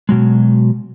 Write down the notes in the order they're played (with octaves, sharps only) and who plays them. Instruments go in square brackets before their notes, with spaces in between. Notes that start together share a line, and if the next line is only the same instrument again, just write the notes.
[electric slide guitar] B2 F#3 G#3